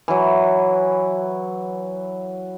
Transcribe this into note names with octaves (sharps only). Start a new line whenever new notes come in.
E3 F#3